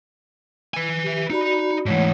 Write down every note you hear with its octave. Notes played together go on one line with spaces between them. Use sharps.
B4 G#5
G4 E5
D#4 F#4 D5 B5
G#2 E3 A3 C#5 F#5